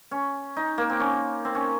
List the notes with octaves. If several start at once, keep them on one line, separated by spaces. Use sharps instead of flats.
C#4
D#4
A#3
C4
C#4
C4
C#4